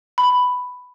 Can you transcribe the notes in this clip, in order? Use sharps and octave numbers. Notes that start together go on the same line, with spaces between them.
B5